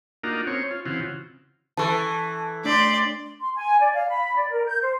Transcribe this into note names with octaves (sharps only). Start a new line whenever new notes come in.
A#3 D4 D#4 F4 F#4 A#4
C4 C#4 C#5
F4
C#3 E3 C4 F4 F#4
E3 A4 A5 C#6
A3 D4 D5 C6 B6
C6
G#5
D5
F5
B5
D5
A#4
G6
C5